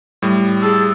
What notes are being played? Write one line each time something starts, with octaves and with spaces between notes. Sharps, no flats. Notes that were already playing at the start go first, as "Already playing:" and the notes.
A2 G3
G#4 A4